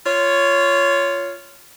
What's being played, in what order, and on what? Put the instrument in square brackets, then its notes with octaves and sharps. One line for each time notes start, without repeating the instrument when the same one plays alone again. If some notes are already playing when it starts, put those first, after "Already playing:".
[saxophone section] F4 C#5